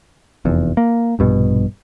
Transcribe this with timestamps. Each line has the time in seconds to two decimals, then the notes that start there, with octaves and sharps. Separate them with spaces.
0.45 F1 E2
0.77 A#3
1.19 A#1 G2 B2